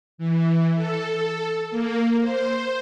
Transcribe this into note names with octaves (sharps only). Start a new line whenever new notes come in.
E3
A4
A#3
C5